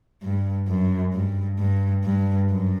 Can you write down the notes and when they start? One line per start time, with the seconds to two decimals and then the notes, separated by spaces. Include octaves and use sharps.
0.23 G2
0.68 F#2
1.13 G2
1.59 G2
2.04 G2
2.49 F#2